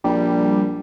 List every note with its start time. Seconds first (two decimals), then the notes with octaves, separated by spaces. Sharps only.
0.04 A#1 G3